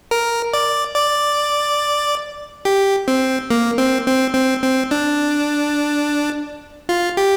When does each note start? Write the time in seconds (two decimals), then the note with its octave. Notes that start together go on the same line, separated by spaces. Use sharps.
0.11 A#4
0.53 D5
0.96 D5
2.65 G4
3.08 C4
3.50 A#3
3.78 C4
4.06 C4
4.35 C4
4.63 C4
4.91 D4
6.89 F4
7.17 G4